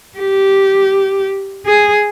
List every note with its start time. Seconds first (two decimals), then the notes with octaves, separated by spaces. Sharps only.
0.18 G4
1.66 G#4